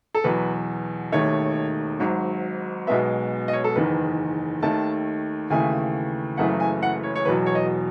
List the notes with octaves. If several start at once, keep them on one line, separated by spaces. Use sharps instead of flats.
A4
E2 B2 F#3 B4
E1 D#2 D#3 A3 C#5
G#1 G#2 F#3
B1 B2 G#3 B3 E5
D#5
C#5
A4
F#1 E2 D#3 B4
D#2 D#3 A3 A5
D#2 C#3 E3 A3 G#5
F#1 F#2 C#3 E3 A3 F#5
G#5
F#5
C#5
C#5
E1 E2 B2 F#3 B4
C#5
D#5